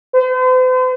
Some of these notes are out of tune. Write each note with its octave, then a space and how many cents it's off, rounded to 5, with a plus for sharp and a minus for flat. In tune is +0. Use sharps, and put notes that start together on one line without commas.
C5 -45